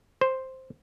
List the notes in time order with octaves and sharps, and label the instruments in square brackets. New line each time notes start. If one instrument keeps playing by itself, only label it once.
[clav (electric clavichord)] C5